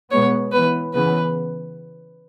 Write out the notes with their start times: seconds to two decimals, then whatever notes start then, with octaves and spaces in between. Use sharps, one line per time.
0.11 B2 G#3 B3 C#5
0.52 E3 B3 B4
0.94 C#3 E3 B3 B4